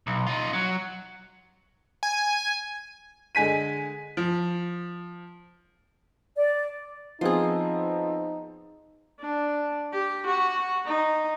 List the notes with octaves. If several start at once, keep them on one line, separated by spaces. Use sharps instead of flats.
B1
D#4 F4
F#3
G#5
D3 G#3 G#5 B6 D#7
F3
D5
F3 B3 C4 D#4 F4 G#4
D4
G4
F#4
D#4